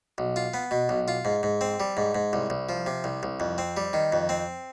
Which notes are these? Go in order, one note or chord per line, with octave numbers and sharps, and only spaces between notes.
B1
F4
B3
B2
B1
F4
G#2
G#2
C4
G3
G#2
G#2
C2
C2
F3
C3
C2
C2
F2
C4
G3
D#3
F2
C4